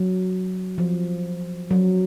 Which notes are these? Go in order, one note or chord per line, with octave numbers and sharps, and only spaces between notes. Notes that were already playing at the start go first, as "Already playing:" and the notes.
Already playing: F#3
F3
F#3